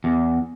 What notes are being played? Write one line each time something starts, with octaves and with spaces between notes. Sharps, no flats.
E2